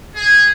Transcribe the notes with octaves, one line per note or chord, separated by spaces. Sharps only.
G#4